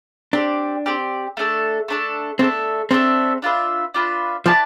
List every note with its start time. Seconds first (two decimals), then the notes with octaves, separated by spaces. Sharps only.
0.33 C4 D4 G4 D5
0.86 C4 G4 D5
1.37 A3 D4 A4
1.88 A3 D4 A4
2.39 A3 C4 D4 A4 E5
2.91 A3 C4 D4 A4 E5
3.42 D4 F4 B4 E5
3.94 D4 F4 B4 E5
4.46 F3 E4 B4 D5 A5